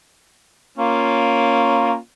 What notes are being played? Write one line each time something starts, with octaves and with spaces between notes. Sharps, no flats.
A#3 C#4 F4